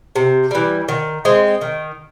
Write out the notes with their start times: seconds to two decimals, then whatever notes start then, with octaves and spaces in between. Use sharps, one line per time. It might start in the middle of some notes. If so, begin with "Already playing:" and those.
0.16 C3
0.51 E3 G3
0.88 D#3
1.25 G#3 C4
1.61 D#3